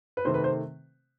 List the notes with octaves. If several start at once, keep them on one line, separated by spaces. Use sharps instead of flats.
B4
C3 D#3 A3 C4 C5
B4
C5